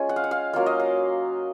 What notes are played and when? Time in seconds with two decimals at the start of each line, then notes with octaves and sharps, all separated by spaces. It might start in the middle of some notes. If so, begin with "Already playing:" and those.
Already playing: G#3 C#4 F4 C#5 G#5
0.09 F#5
0.16 F5
0.24 F#5
0.31 F5
0.53 F#3 A#3 C#4 F4 F5
0.66 D#5
0.80 F5